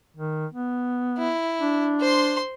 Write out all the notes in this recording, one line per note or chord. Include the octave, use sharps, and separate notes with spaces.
D#3
B3
E4
D4
C5 C6